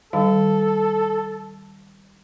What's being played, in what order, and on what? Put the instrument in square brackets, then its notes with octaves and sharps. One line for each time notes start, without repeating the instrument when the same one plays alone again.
[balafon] D#3 G3 F5 [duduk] A4